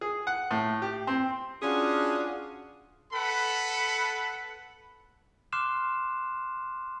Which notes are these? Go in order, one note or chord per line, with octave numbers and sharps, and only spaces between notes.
G#4
F#5
A2
G4
C4
C#4 D4 F4 F#4 G#4
A4 B4 F#5 B5
C6 D6 F6 F#6 C7 E7